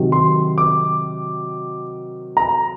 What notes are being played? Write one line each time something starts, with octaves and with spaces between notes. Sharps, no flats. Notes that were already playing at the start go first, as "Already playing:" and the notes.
Already playing: C3 D#3 F#3
C6
D6
A#5